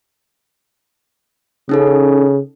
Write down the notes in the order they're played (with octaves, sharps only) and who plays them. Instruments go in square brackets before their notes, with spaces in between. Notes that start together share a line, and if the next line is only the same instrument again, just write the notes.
[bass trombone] C#3 [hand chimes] C#4 D#4 A4